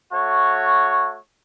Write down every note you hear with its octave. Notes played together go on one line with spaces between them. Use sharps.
A3 F#4 C#5